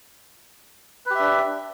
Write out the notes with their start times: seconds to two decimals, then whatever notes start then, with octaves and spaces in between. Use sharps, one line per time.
1.06 B4
1.11 G4
1.15 E5
1.20 D4